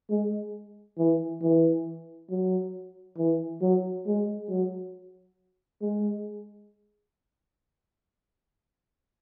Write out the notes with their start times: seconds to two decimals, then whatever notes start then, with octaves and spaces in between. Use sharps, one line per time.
0.10 G#3
0.98 E3
1.42 E3
2.30 F#3
3.18 E3
3.61 F#3
4.07 G#3
4.50 F#3
5.82 G#3